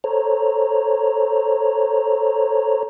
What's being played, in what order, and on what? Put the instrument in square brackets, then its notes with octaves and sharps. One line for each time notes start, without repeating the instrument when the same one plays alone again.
[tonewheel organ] A4 C5 C#5 A#5